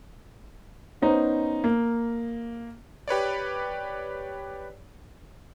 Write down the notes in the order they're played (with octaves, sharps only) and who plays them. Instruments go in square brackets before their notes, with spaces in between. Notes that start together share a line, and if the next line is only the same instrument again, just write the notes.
[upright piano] B3 C#4 D#4 C5
A#3
[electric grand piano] G4 B4 C#5 D5